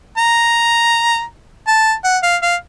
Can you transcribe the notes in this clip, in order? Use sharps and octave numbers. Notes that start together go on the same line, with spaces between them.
A#5
A5
F#5
F5
F5